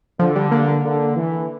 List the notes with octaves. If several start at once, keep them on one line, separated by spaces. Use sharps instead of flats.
D3 F3
G3
A#3
D3
E3